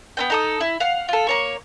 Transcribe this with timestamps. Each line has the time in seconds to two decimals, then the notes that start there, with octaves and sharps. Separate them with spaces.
0.17 B3 C4 G5
0.30 D#4 A4 D#6
0.61 E4
0.80 F5 F#5
1.09 F4 A4
1.27 A#3 C#5 C#6